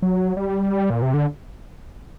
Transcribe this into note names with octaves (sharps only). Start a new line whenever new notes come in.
F#3
G3
A#2
C3
D3